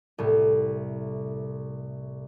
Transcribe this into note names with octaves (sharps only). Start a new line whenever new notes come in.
C2 A2